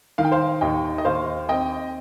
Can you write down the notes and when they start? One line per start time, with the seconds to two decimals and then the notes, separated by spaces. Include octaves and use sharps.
0.18 D#3 F5
0.24 G5
0.31 C5 F5
0.61 D#2 D#5 G5
0.98 D#5
1.05 D#2 C5 F5
1.49 C4 D#5 G5